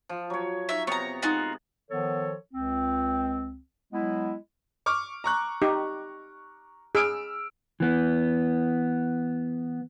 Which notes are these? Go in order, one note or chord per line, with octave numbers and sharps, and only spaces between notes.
F3
F#3 C#5
D#4 E5
C3 B3 C#5 A#5
G#3 D#4 F4 F#4
D#3 F3 B3 A4 C#5
C#2 C4
F#3 G#3 B3 E4
C#6 D6 F6
A#5 C#6 F#6
D#4 G4
G#4 E6 F6 D7
E3 B3